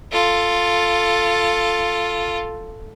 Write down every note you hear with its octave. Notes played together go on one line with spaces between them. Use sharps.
F4 A4